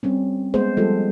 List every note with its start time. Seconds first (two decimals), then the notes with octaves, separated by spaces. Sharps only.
0.03 G3 C4 C#4
0.54 G#3 B3 G#4 C5
0.77 F3 G3 G#3 F4 G4 A4